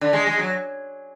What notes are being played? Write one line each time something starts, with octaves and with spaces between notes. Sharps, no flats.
D3
G#3
G#3
F#3